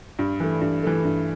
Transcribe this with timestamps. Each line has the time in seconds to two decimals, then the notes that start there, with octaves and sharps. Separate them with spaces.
0.19 G2
0.40 E3 A3
0.61 G2
0.83 E3 A3
1.05 G2